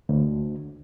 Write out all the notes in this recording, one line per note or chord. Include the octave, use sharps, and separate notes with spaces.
D2